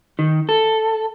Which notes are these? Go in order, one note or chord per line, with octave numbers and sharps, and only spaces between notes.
D#3
A4